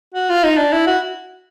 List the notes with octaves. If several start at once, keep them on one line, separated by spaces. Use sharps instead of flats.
F#4
F4
D#4
D4
E4
F#4